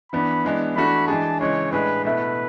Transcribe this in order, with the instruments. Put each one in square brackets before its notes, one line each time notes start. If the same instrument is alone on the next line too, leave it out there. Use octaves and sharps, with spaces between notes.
[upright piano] E3 B3 D4 [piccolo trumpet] B5
[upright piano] E3 G#3 B3 D4
[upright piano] E3 A3 D4 F#4 [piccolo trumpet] B5
[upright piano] E3 G#3 D4 G#4 [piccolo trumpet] A5
[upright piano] C#3 E3 G#3 [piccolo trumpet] C#5
[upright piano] A2 G#3 D4 G#4 [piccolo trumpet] B4
[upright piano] B2 A3 E4 [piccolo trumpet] B4